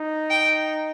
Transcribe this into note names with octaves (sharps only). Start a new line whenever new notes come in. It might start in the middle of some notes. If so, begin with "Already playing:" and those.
Already playing: D#4
G5